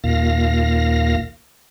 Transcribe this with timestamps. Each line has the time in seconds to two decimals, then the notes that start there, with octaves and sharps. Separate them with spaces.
0.04 D#2 A#2 F5 A#6